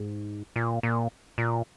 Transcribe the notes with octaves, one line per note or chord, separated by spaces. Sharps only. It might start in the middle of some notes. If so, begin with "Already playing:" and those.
Already playing: G#2
A#2
A#2
A#2